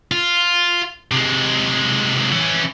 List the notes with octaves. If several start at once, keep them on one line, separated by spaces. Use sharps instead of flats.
F4
C3 G#3
E3 C#4